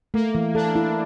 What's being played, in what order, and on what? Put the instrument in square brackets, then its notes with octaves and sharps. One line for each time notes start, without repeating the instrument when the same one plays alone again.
[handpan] A3 [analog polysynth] A#3
[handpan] E3
[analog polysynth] D4 [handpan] A4
[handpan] E4